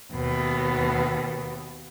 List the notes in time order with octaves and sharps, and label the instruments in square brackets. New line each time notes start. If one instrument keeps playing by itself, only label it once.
[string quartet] D#2 B2